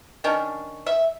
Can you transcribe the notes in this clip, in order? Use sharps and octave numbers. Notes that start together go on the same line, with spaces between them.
D#3 C#4 D4
E5